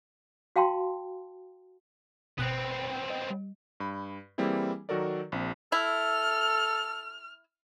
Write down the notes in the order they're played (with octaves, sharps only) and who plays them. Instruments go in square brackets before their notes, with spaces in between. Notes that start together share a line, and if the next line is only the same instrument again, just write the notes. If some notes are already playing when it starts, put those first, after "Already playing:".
[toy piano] F#4 F5 G5 A5 C6
[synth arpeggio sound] G1 B2 F#6 [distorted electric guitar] B3 C4
[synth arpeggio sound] D#5
G3
[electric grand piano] G2 B5
E3 G3 A#3 C4 E4 G#4
D#3 F#3 F#4 A4 A#4 D5
A#1 C4
[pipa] E4 [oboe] A4 [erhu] F6